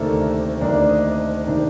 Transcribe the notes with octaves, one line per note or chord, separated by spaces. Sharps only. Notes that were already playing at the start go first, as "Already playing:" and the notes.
Already playing: D2 C3 D#3 A#3 D4 A4
D2 C3 D#3 A#3 D4 D#5
D5
D#5
C3 D#3 A#3 D4